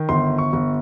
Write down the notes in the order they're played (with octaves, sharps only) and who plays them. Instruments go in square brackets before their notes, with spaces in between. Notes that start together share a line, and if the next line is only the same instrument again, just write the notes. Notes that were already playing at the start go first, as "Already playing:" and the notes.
Already playing: [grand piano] D#3
G1 C6
C#6
G1